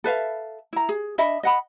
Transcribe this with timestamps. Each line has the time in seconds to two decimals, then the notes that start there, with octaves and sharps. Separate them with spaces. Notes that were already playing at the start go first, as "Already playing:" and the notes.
0.04 A4 B4 E5 F5
0.73 E4 A#5
0.89 G#4
1.18 D4 D#5 E5 B5
1.43 D#5 F#5 B5